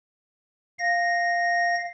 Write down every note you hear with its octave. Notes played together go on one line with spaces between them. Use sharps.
F5 A#6